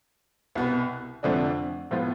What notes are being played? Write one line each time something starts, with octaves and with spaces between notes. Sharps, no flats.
C2 B2 B3
F2 D3 F3 A3 D4
A2 F3 B3 F4